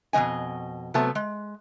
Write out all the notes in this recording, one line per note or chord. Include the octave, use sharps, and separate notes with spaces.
F2 B2 G#3 D#5 G#5
C3 F#3 A3 B3 A5
G#3